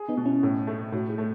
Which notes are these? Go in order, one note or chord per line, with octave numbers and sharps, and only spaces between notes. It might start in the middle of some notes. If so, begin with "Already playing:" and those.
Already playing: G#4
B3 D#4
B2
C#4 E4
A2
A3
A2 D#4 F#4
E4 G#4
A3